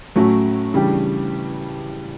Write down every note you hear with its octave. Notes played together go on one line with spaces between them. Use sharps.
A2 F#3 A3 C#4 F#4
C#3 E3 G3 D4 G4